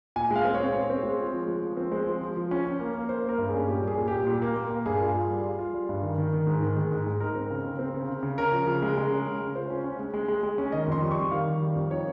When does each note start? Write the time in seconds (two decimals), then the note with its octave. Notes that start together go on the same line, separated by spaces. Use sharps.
0.16 A#2 G#5
0.31 G#3 F5
0.45 C4
0.54 C#5
0.60 C4
0.75 C4
0.90 C4
1.03 G#3
1.19 F4
1.33 F3
1.47 G#3
1.62 F3
1.77 C4
1.91 G#3 C5
2.07 F3
2.21 F3
2.36 F3
2.51 C#4
2.66 C#4
2.80 A#3
2.94 A#3
3.09 A#3 C5
3.24 A#3 A#4
3.38 G2
3.48 G#4
3.54 C#4
3.68 A#2 G4
3.83 G3 G#4
3.98 A#2
4.08 G4
4.13 A#2
4.27 A#2
4.42 A#3
4.56 A#3
4.70 A#3
4.86 G2 G#4
5.00 F4
5.14 F4
5.29 G3
5.44 F4
5.59 F4
5.74 G3
5.89 G2
6.02 D#3
6.18 D#3
6.33 D#3
6.47 G#2
6.62 D#3
6.76 G#3
6.92 G#2
7.06 G#3
7.20 D#4 A#4
7.35 C4
7.50 C#3
7.64 C4
7.79 C4
7.94 C#3
8.08 C#3
8.23 C#3
8.38 C#4 A#4
8.53 F3
8.67 C#3
8.82 G#3
8.97 G#3
9.11 C#4
9.27 C#3
9.40 G#3
9.55 F4 C5
9.70 C#4
9.84 C#4
9.99 G#3
10.14 G#3
10.28 G#3
10.43 G#3
10.58 C#4
10.72 D#3 D#5
10.88 F2 C6
11.02 G3
11.11 C#6
11.17 G3
11.31 D#3 F5
11.46 D#3
11.61 G3
11.75 F2
11.91 D#4 C#5